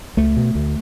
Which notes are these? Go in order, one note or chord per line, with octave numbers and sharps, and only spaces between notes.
C#2 A3
B2
D2